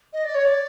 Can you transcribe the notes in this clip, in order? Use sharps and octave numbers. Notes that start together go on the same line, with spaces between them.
D#5
D5
C#5
D5